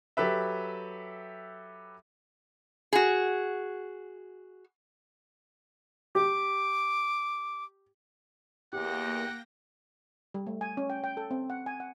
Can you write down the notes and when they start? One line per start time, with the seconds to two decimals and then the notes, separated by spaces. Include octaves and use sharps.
0.17 F#3 G4 A4 B4 E5
2.93 F#4 G#4
6.15 G4 D6
8.73 E2 A#3 G4 F#5 G5 A#6
10.34 G3
10.47 A3
10.61 G#5
10.77 C#4
10.90 G5
11.04 G5
11.17 A4
11.31 C4
11.50 F#5
11.66 G#5
11.80 F#5